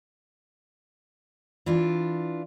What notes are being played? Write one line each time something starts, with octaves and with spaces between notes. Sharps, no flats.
E3 D4 F4